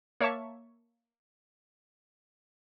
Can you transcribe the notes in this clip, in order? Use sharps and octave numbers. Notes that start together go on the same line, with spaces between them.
A#3 C#5 E5 A5 C#6